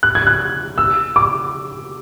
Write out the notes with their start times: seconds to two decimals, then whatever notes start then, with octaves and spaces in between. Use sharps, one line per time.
0.03 F#6
0.15 G#6
0.27 F#6
0.78 E6
1.16 D6